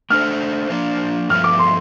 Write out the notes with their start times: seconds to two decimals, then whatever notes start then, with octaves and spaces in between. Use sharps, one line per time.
0.10 A3 D4 A4 C5 F6
0.70 F3 A#3 D4
1.30 G2 F3 A3 F6
1.44 D6
1.59 C6